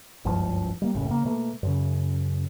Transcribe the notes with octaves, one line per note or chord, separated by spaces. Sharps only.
F#1 C#2 G2 F3
G3 A#3
F#1 C#2 A2 C#3
C#3 A#3
B2 A3 A#3
F#2 C#3